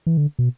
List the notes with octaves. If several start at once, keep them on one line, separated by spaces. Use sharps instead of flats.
E3
D3
B2